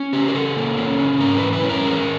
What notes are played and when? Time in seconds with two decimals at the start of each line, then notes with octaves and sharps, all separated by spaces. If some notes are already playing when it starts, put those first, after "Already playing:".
Already playing: C#4
0.13 C#3 G4
0.28 A#4
0.34 C#3 A4
0.57 A#3
0.77 C#4
0.99 C#3
1.20 G#2 A#4
1.37 E3 B4
1.53 B4
1.64 C#4
1.69 A#4
1.85 G#3